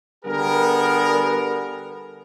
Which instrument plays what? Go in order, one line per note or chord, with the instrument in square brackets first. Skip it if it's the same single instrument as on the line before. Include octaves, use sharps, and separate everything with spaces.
[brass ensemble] D3 G3 B3 G#4 A#4